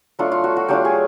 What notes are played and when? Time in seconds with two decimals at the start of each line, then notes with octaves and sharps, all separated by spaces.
0.19 F#3 A3 D4 F4 A4
0.32 F4
0.44 F#4
0.57 F#4
0.68 F#3 A3 D4 F4 G4
0.85 G#4